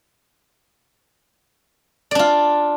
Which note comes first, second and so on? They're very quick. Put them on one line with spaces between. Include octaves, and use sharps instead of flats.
D5 D4 F4